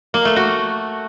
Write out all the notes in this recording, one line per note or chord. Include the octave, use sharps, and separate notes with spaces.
A#3
A3
F#4